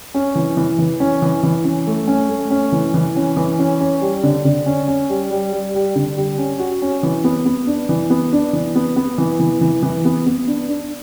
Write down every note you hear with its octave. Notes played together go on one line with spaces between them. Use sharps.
C#4
E3
E3
E3
C#4
E3
E3
C#4
A3
C#4
A3
C#4
E3
E3
C#4
E3
C#4
C#4
G3
D3
D3
C#4
C#4
G3
G3
G3
G3
D3
G3
C#4
F#4
C#4
E3
B3
B3
D4
E3
B3
D4
E3
B3
B3
E3
E3
E3
E3
B3
B3
D4
D4